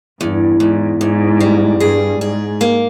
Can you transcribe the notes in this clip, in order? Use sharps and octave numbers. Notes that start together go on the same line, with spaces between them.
E2 G2
E2 G#2
E2 G#2
G3
G2 G#4
G#2 G#4
A#3